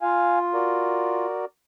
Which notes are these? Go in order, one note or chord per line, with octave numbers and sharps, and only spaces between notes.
F4 F5 G#5
F#4 A#4 D5